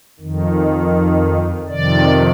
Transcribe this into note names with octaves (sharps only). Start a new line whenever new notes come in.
F2 D#3
F2 C3 D#3 D5